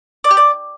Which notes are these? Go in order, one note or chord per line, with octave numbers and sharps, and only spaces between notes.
D5
G4
D5